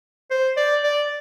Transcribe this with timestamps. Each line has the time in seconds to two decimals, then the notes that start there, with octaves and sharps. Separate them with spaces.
0.30 C5
0.57 D5
0.84 D5